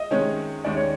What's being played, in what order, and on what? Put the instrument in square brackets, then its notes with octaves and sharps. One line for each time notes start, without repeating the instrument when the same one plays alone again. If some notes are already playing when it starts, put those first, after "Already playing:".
Already playing: [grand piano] D#5 E5
[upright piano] C3 D#3 G#3 C#4 [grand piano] C#5
[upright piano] D#2 D#3 G#3 C#4 [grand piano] D5
[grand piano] C#5